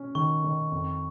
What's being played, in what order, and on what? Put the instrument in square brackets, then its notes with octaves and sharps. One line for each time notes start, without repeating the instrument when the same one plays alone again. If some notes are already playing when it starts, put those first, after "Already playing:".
Already playing: [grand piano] C#4
[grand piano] D#3 [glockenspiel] C#6
[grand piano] D#3
F2